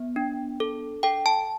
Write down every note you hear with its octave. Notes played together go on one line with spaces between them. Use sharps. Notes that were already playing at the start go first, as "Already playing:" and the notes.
Already playing: B3
D4
A4
A4 G5
A5